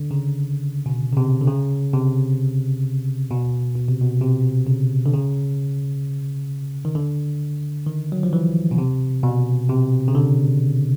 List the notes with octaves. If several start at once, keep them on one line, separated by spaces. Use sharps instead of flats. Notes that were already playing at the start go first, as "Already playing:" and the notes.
Already playing: D3
C#3
B2
C#3
C3
D3
C#3
C3
B2
B2
C3
B2
C3
C#3
D3
C#3
D#3
D3
D#3
F#3
F3
E3
B2
C3
B2
C3
C#3
D3